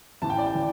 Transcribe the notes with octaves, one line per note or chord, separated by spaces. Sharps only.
A1 A2 E3 A5
G5
D5
G5
E3